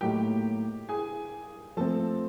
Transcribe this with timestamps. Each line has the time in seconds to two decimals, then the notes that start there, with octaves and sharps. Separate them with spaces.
0.01 A2 F#3 A#3 D#4 G4 G5
0.89 G#4 G#5
1.77 F3 A3 C4 A4 A5